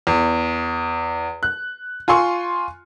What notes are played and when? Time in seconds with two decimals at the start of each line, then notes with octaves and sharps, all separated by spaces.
0.07 E2
1.43 F#6
2.08 F4 G#5 C6 C#6